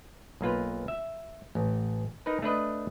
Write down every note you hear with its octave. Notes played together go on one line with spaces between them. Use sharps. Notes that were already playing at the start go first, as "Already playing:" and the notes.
B1 A#3 F4 B4
E5
A1
D#4 A#4 B4
A3 D4 B4 D#5